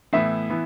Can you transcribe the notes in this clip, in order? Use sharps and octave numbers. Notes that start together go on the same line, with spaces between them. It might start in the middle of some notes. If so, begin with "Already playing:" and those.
A2 E3 B3 E4 E5
E3 B3 E4